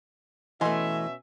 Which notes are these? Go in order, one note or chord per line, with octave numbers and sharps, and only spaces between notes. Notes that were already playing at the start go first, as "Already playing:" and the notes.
B2 E3 A3 C#4 D#5 E5 G#5 C6